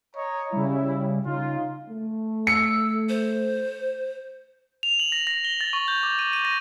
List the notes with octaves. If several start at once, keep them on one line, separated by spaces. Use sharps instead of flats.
C#5 D#5 A#5
C#3 G3 E4
C#3 D#4 F4
A3
E6 C#7
C5
F7
F#7
A#6
A#6
G7
A6
C#6
G6
D6
D#7
D#7
A#6